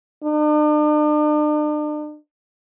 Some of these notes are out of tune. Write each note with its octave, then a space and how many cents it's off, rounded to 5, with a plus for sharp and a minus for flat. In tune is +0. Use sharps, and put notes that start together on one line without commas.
D4 +45